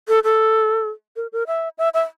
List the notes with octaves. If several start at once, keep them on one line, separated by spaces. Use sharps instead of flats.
A4
A4
A#4
A#4
E5
E5
E5